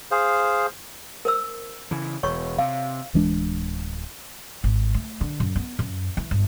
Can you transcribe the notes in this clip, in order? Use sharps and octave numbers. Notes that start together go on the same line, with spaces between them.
G#4 C5 F5
A#4 C5 E6
C#3 E3
E1 C#5 C#6
C3 F5
D1 E3 G#3 D4
G#1
A3
D3
F#2
B3
F#2
E3
G1